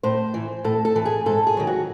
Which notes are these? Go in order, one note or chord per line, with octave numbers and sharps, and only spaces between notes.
A2 C5
E3
A2 A4
A4
E3
G#4
G#2 A4
G#4
D#3 F#3
F#4